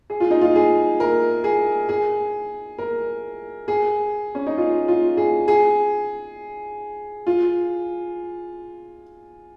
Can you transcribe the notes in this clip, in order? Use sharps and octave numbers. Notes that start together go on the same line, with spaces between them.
G#4
F4
D#4
F4
G#4
A#4
G#4
G#4
A#4
G#4
C#4
D#4
F4
F4
G#4
G#4
F4